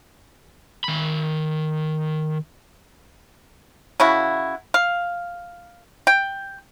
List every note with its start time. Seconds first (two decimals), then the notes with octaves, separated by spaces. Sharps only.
0.84 D#3 B5
4.00 C#3 E4 F#4
4.74 F5
6.07 G5